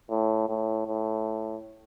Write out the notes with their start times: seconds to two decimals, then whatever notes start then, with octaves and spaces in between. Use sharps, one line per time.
0.10 A2
0.49 A2
0.87 A2